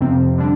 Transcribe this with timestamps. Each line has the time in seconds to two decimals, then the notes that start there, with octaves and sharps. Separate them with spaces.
0.01 F2 C3 F3 C4
0.38 D3 G3 D4